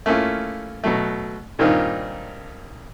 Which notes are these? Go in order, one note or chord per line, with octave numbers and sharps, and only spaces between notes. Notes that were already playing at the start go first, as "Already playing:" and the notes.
A3 A#3 C#4 E4 F4
B2 F#3 A3
G2 A#2 D#3 C4 D#4 F4